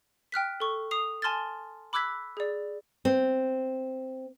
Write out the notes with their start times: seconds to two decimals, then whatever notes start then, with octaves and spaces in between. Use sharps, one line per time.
0.32 G5 F6 F#6 B6
0.60 A4 C#6
0.91 D#6 C7 F7
1.22 G#5 A5 C6 F6 G#6 A6
1.93 B5 D6 E6 F#6 G#6 B6
2.37 G#4 D5
3.05 C4